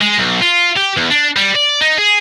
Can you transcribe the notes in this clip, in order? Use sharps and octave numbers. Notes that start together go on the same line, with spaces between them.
G#3
B1
F4
G4
E2
D4
G3
D5
D#4
G#4